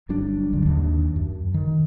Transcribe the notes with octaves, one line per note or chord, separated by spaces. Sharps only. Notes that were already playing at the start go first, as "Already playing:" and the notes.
G1 G2 F#3 D4
D1 G#1 G#2 D3
D#2 D4
F#2
D#3